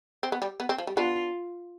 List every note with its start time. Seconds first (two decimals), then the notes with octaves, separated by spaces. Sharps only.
0.23 C4
0.32 B3
0.42 G3
0.60 B3
0.69 C4
0.78 F3
0.87 G3
0.97 B3 D4 F4